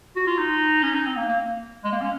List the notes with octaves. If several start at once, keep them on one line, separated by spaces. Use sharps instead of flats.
F#4
F4
D#4
C#4
D#4
C4
A#3
A#3
G#3
A#3
C#4